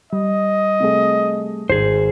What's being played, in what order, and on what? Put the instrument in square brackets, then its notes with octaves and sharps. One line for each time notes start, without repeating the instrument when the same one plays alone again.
[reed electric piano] G3 [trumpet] D#5
[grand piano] C3 A3 G#4
[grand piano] G#1 [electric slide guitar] G#4 C5